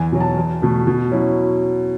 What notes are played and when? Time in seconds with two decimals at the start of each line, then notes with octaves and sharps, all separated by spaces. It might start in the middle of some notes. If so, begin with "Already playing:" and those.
Already playing: E2 G#5
0.12 B2 F#3
0.20 A5
0.37 E2
0.62 B2 A3
0.87 B2
1.12 F#3 C#4 E4